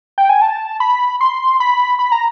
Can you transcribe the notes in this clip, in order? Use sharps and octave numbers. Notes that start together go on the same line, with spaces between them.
G5
G#5
A5
B5
C6
B5
B5
A#5